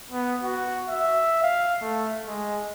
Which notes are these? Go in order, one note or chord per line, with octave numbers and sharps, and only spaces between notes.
B3
F#4
E5
F5
A3
G#3